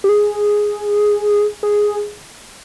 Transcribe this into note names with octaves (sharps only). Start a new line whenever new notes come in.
G4
G#4
G#4